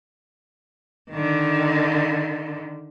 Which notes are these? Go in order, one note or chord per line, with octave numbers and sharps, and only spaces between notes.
D3 D#3